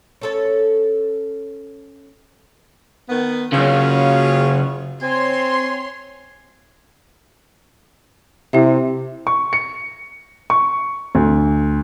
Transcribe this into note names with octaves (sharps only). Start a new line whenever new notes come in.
C#4 A4 C#5
D#3 B3
F#2 C#3 C#4 F4 G#4
C4 C#5 G#5 C6
C3 E4 G4 E5
C#6
C#7
C#6
D2